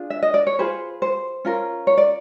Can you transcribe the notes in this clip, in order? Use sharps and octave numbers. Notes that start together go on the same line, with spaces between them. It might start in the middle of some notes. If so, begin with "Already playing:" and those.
Already playing: D4 F4 G#4
E5
D#5
D5
C#5
F4 G#4 B4 C5
C5
C#4 F4 A#4
C#5
D5